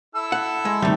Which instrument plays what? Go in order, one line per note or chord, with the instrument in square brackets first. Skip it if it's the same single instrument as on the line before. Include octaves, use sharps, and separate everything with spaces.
[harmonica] E4 A4 E6
[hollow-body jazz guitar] F#5
G#3
[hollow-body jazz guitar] C3 A3 [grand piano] D#3 G3